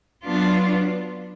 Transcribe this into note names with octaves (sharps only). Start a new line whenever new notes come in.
F#3 B3 D4 F4